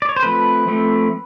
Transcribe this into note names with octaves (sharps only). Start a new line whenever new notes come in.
D5
C#5
C5
F3 A3 C4 B4
F3 A3 C4